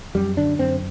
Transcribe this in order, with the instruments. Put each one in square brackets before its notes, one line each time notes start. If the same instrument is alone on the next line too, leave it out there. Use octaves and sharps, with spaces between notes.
[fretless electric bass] F#2 G3
D3 D4
F#2 C4